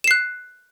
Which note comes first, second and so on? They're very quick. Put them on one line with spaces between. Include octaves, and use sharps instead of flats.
E7 C7 F#6